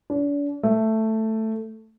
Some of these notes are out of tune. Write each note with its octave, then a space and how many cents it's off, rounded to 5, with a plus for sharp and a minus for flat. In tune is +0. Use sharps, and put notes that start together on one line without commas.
D4 -40
A3 +5